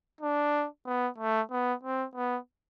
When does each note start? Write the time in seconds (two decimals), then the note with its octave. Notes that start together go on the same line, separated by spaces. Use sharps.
0.21 D4
0.86 B3
1.18 A3
1.51 B3
1.83 C4
2.15 B3